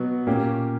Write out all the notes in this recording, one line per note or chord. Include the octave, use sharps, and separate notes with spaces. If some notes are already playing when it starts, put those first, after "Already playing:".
Already playing: B2 F#3 B3 F#4 B4
A#2 A#3 C#4 G4